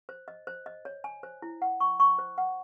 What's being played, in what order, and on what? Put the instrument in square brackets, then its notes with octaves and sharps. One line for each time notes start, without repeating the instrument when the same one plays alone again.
[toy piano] C5
D#5
C5
D#5
C#5
G#5
C5
E4
F#5
C#6
C#6
C5
F#5